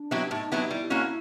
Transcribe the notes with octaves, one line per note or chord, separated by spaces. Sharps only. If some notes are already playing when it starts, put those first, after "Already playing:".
Already playing: D4
F#3 B3 E4 G4
A2 D#4
F#3 B3 E4 G4
G3 E4
A#3 C#4 F#4